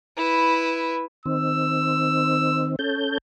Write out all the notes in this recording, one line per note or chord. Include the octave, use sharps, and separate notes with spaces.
E4 B4
D#3 C4 E6
C#4 A4 G6